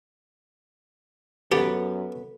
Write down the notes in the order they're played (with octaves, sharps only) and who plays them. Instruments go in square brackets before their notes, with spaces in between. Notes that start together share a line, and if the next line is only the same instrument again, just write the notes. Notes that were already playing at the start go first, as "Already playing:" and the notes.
[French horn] F#2 [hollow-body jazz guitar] B3 [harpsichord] G4 [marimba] A4